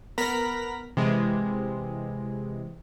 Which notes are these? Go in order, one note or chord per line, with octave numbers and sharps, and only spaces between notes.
B3 A#4 A#5 B5 B6
C3 E3 G#3